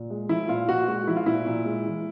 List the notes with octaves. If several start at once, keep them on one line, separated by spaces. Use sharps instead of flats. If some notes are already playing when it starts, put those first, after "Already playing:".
Already playing: A#2
G#3
F3 E4
A#2 F4
A#2 F#4
G#3 F#4
F3 E4
F4
A#2 E4
A#2
G#3
E3